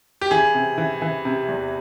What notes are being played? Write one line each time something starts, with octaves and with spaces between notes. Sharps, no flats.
G4
E3 G#4
C3
E3
E3
C3
E2